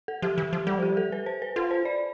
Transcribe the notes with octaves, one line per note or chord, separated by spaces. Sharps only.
A4
F3 G4
E3
F3
G3 A4
F3 G4
G3
A4
B4
C5
B4
F4 A4
C5
D5